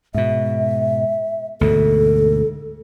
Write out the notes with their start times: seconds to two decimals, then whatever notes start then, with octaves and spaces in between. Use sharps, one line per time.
0.14 G#2 B2 E5
1.61 D2 G#2 B2 A4